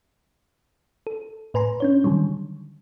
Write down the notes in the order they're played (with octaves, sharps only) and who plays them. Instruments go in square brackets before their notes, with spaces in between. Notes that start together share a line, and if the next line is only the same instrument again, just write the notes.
[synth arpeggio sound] A4
A2 B4 G#5 A#5 C6
C#4 D4 C#5
D3 D#3 F#3 G3